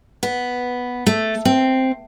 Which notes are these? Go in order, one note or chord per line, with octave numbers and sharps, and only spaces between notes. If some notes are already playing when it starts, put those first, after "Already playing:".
B3
A3
C4